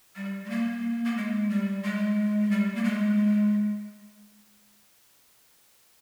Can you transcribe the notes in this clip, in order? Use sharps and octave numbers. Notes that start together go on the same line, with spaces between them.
G3
G#3
A#3
A#3
G#3
G3
G#3
G3
A#3
G#3